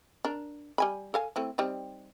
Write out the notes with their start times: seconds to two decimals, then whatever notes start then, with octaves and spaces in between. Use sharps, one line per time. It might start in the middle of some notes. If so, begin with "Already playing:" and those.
0.25 D4 A#4
0.78 G3 G#5 B5
1.14 A4 F5 G#5
1.36 A3 C4 E4
1.58 G3 C4 D#4